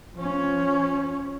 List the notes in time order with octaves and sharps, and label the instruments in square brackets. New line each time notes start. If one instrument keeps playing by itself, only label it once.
[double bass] F3 C#4